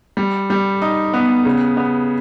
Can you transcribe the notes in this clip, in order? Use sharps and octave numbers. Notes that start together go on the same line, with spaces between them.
G3
G3
D#4
B3
C#3
B3